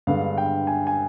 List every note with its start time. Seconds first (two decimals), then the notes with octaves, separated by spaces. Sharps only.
0.07 G2 D3 G#3 B3 F5
0.38 G5
0.67 G#5
0.87 G#5